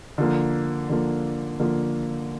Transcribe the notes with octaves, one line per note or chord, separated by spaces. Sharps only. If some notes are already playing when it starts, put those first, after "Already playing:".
D3 F3 A#3
D3 F3 A#3
D3 F3 A#3